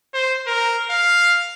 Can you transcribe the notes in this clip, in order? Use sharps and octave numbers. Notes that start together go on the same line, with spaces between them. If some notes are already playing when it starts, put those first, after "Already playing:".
C5
A#4
F5